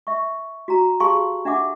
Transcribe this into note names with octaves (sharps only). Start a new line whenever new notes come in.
E5 C#6
F#4 A#5
G4 G#4 F5 A5 C6 C#6
D4 E5 F#5 D6